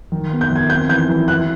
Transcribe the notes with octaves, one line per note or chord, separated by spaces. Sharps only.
D#3
B3
G6
D#3
G#6
C4 G6
E3 G6
E3
E3 F#6